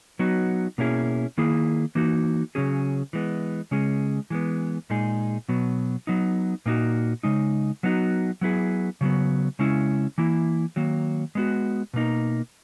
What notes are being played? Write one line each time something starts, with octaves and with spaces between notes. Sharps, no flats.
F#3 B3 D#4 F#4
B2 A#3 C#4 E4 G#4
D#3 A#3 E4 G#4
E3 A#3 D#4 F#4
C#3 F#3 C#4 G#4
E3 G#3 B3
C#3 G#3 C#4 G#4
E3 G#3 B3
A#2 G#3 D#4 G#4
B2 F#3 B3
F#3 B3 D#4
A#2 A#3 D#4 F#4
C#3 G#3 D#4
F#3 B3 D#4 F#4
F#3 B3 E4 G#4
C#3 F#3 B3
C#3 G#3 C#4 E4
E3 A#3 E4
D#3 F#3 A#3
G#3 B3 F#4
B2 A#3 D#4